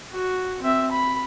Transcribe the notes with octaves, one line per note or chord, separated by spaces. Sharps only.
F#4
C4 E5
B5